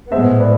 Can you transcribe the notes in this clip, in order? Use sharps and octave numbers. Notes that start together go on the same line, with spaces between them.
A2 G#3 B3 C5 E5
B4 D5